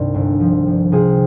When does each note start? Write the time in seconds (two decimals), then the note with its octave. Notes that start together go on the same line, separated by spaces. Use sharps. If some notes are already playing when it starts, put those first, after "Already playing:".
Already playing: C2 G2 C3 D#3 D4 F4
0.14 G1
0.40 F3
0.66 G1
0.92 C3 F4 G#4